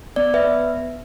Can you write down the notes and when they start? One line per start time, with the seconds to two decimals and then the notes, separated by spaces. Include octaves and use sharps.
0.16 B3 D5
0.34 B4 E5
0.42 B3